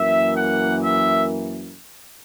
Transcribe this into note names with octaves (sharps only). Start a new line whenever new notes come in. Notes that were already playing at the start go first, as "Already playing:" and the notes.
Already playing: F#2 E3 A#3 E5
F#5
E5